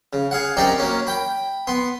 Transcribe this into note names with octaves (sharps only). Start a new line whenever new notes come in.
C#3
G#4 F5 F#5
F#2 C4 D#4 G4 D5 A#5
F#3 A#3 C#4
G5 B5
B3 C6